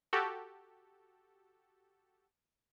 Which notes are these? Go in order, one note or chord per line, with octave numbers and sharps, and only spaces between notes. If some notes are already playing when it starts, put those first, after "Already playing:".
F#4 G4 A4